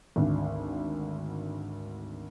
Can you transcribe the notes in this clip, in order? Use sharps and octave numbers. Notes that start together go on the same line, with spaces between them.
G#1 D2